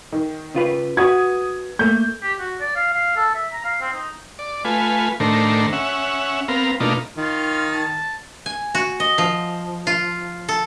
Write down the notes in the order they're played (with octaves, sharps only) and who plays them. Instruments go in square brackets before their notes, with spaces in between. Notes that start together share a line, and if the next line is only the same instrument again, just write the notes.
[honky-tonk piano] D#3
[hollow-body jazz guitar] C#3 F4 B4
[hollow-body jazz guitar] F#4 B4 [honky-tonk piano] D#6 G#6
[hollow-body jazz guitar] A3 A#3 [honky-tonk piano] G6
[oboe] G4
F#4
D5
F5
F5
A4
E5
A#5
F5
C4
D#4
[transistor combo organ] D5
A3 F4 B4 G#5
A2 D#3 A3 D4 A#4 C5
C#4 E5 F#5
B3 C4 A#4 F5
B2 A3 A#3 D4 D#4 F4
[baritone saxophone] D#3 [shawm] F4
[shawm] A5
[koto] G#5
F#4
D#5
F3
F4
A4